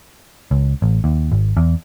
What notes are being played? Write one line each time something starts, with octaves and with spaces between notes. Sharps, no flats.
C#2
A1
D#2
G#1
E2